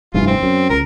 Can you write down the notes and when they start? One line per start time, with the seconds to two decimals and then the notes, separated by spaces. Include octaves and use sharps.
0.14 F1 G2 E3 F4
0.27 C4
0.43 F#2
0.70 C#2 A#4